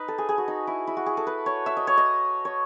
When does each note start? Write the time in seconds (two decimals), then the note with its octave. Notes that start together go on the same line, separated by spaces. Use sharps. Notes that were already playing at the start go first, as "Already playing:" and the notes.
Already playing: D#4 B4
0.08 A4
0.18 G#4
0.29 G#4
0.38 F#4
0.48 D#4
0.67 E4
0.87 E4
0.97 F#4
1.06 G#4
1.17 A4
1.27 B4
1.46 C#5
1.66 E5
1.77 D#5
1.87 C#5
1.97 D#5
2.45 C#5